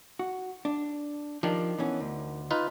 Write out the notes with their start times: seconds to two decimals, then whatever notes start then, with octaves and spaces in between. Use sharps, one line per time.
0.19 F#4
0.65 D4
1.43 D#3 F3 D4 G4
1.78 E3 B3 C#4
2.00 D2
2.51 D#4 F4 B4